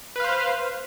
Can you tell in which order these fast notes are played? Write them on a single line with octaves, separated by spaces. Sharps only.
B4 F5 C5